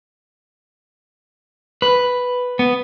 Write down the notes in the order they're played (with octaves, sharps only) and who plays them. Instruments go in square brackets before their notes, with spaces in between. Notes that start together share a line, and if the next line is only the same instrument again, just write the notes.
[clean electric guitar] B4
B3